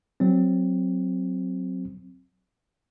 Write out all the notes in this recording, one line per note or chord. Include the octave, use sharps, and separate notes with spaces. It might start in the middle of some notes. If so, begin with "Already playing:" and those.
F#3 C4